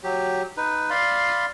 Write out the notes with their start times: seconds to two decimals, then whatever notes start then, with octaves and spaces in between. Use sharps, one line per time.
0.04 F#3 G4
0.57 D#4 B4
0.90 D5 F5 B5 C6